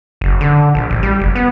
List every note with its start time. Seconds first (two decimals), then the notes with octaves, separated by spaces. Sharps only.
0.21 F#1
0.41 D3
0.75 A#1
0.90 A1
1.03 G3
1.20 F#1
1.35 B3